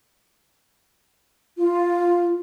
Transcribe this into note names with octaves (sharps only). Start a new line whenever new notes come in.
F4